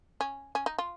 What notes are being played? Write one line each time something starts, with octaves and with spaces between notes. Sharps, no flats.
C#4
C#4
D#4
F4